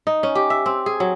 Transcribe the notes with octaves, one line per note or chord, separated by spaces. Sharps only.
D#4
C#4
G4
E5
C4
G#4
F#3